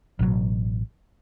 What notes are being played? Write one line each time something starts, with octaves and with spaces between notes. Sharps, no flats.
A1 B2 D3 F#3